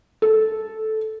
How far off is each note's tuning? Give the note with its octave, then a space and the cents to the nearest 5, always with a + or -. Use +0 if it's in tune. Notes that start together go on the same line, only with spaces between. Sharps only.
A4 -10